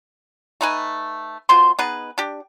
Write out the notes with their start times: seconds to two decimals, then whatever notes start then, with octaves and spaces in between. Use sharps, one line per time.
0.61 A3 D#4 B4 G#5
1.49 B2 F4 C5 C6
1.79 B3 D#4 G#4 B4
2.18 D4 G4